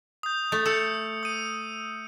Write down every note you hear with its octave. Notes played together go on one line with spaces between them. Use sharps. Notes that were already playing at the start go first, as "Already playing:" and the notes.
D#6 G6
A3
A4 E6 C#7
D#6 D#7